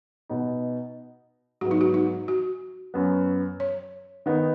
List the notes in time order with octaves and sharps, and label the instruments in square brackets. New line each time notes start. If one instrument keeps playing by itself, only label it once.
[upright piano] B2 B3 D#4
[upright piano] G#2 F#3 B3 [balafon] F#4
[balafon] D#4
F#4
D#4
F#4
[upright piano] F#2 F#3 B3
[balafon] C#5
[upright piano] D#3 B3 D#4